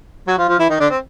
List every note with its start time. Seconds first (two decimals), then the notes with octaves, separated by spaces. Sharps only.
0.27 F#3 F#4
0.38 F3 F4
0.48 F3 F4
0.59 E3 E4
0.69 D#3 D#4
0.80 D3 D4
0.90 C4